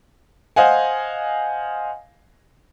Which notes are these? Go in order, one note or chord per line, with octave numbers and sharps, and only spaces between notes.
C5 D#5 F5 F#5 G#5